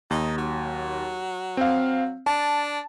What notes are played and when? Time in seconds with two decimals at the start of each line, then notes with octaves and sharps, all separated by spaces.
0.10 D#2 D#4
0.38 F#3
1.57 C4 F5
2.26 D4 A5